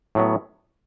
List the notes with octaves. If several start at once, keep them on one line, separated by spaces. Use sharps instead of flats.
A2 F#3 B3